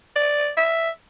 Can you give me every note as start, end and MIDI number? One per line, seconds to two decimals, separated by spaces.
0.16 0.50 74
0.57 0.90 76